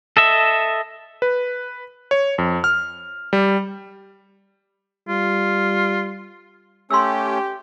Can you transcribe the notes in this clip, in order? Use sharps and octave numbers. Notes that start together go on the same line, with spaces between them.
A4 D#5 E5
B4
C#5
F2
F6
G3
G3 F4
A3 C#4 G4 C6 E6